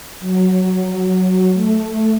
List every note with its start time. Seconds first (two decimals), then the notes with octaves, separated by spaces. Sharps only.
0.20 F#3
1.53 A3